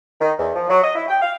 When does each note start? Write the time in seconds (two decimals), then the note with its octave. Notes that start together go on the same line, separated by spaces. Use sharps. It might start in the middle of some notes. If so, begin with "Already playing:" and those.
0.20 D#3
0.38 E2
0.54 F3
0.69 F#3
0.83 D#5
0.95 E4
1.08 G5
1.21 F5